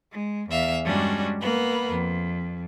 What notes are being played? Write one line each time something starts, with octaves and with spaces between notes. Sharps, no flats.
G#3
E2 E5 F5
G2 G3 G#3 C#4 D4 F#4
A#3 B3 B4
F2